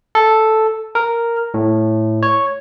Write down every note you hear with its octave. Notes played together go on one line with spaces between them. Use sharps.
A4
A#4
A2
C#5